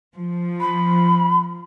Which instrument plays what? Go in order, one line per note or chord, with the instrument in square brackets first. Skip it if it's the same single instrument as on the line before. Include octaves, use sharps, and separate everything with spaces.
[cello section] F3
[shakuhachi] B5